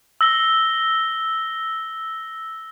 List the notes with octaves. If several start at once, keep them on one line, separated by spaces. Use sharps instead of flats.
E6 A#6 G7